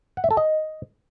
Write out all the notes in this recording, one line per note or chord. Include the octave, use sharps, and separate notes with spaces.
F#5
E5
A4
D#5